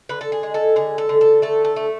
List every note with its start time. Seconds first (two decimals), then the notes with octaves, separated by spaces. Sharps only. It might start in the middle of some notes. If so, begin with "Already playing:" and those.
0.09 D3 B4
0.21 A4
0.32 G#4
0.43 G#3
0.54 A4
0.76 D3 G#4
0.98 A4
1.09 D3
1.21 A4
1.42 A3 A4
1.65 A4
1.76 A3